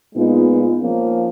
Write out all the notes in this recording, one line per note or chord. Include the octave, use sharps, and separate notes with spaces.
A#2 G#3 B3 D#4 F4
F4
F3 A#3 C#4